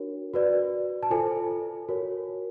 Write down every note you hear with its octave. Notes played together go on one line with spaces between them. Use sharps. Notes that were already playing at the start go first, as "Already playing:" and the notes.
Already playing: D4 F#4 A#4 C#5
F#4 B4 D5
A5
F4 A4 C5 G#5
F#4 A#4 C#5